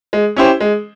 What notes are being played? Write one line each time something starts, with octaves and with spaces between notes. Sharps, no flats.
G#3
C#4 E4 G4 C5
G#3